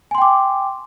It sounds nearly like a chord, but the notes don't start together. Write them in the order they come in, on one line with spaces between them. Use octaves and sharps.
G#5 C6 G5 D6